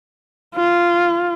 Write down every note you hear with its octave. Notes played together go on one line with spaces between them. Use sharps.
F4